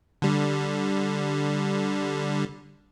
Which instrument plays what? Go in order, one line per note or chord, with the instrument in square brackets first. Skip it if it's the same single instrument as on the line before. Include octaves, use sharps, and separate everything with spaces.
[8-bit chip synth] D3 G3